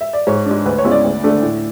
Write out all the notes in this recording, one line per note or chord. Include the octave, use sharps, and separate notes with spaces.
E5
D5
G#2 C#5
G#3 D4
D2 B4
C#5
C#3 G#3 B3 E4
D5
D2
D3 A3 D4
A2